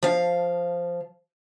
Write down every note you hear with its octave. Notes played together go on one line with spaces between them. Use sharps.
F3 F5